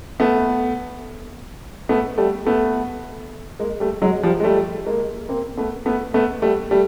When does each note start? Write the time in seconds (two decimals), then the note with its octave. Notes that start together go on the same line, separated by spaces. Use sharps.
0.20 A3 B3
1.89 A3 B3
2.18 G3 A3
2.46 A3 B3
3.59 G#3 A#3
3.80 G3 A3
4.02 F#3 G#3
4.23 F3 G3
4.40 G#3
4.44 G3 A3
4.86 G#3 A#3
5.29 A#3 C4
5.57 A3 B3
5.86 A3 B3
6.14 A3 B3
6.42 G3 A3
6.71 G3 A3